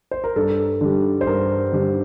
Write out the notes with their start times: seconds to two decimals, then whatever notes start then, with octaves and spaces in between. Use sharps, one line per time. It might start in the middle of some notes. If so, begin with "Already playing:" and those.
0.11 C5
0.24 A#4
0.36 G2 A4
0.81 D3 G3
1.21 C5
1.27 G2 A#4
1.73 D3 G3